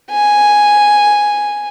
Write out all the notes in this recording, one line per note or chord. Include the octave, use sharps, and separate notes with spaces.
G#5